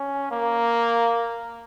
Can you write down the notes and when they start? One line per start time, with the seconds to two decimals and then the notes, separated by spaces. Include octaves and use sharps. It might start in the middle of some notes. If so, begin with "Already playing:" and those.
Already playing: C#4
0.31 A#3